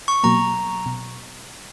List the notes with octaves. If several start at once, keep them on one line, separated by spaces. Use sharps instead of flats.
C#6
B2 F#3 A#3 A#5
B2